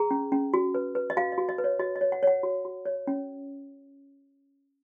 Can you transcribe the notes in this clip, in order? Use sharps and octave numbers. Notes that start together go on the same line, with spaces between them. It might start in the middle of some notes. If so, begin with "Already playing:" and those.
Already playing: G#4 A#5
C#4
C#4
F#4
B4
B4
D#5
F#4 F5
D#5
F#4
D#5
B4
C#5
F#4 D#5
D#5
C#5
F#5
C#5 F#5
F#4
F#4
C#5
C#4